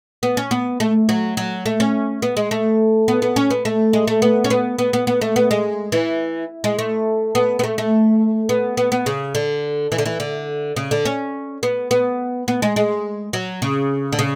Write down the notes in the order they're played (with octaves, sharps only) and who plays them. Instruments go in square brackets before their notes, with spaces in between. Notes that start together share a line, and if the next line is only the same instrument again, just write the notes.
[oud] B3
C#4
B3
A3
F#3
F#3
A3
C#4
B3
G#3
A3
B3
B3
C#4
B3
A3
G#3
A3
B3
C#4
B3
B3
B3
B3
A3
B3
G#3
E3
G#3
A3
B3
B3
A3
A3
B3
B3
B3
C#3
D3
E3
D3
E3
D3
C#3
D3
C#4
B3
B3
B3
G#3
G#3
F#3
C#3
D3
C#3